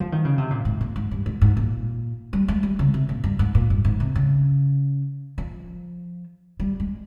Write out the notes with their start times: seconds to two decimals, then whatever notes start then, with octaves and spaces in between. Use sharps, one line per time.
0.00 F3
0.12 D#3
0.25 C#3
0.38 C3
0.50 A#2
0.65 G#2
0.81 A#2
0.96 G#2
1.11 G2
1.26 G#2
1.41 G#2
1.57 A#2
2.33 G3
2.48 G#3
2.63 G3
2.79 C#3
2.94 C3
3.09 A#2
3.24 G2
3.39 G#2
3.55 A#2
3.70 G2
3.85 G#2
4.00 C3
4.16 C#3
5.38 F3
6.60 G3
6.80 G#3